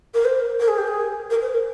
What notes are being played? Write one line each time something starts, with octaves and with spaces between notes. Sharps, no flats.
A#4
C5
A#4
G#4
G4
G#4
A#4
C5
A#4